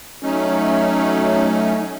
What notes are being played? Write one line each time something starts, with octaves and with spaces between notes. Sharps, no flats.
F#3 A3 C#4 D#4